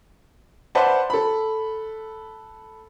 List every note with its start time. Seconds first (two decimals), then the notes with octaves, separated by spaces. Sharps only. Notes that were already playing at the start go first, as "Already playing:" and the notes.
0.75 B4 C5 D5 E5 F#5 A5
1.10 A4 B5